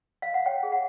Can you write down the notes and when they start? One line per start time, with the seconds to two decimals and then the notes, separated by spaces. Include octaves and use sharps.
0.22 F5
0.34 F#5
0.46 C#5 G5
0.63 G#4
0.72 F#5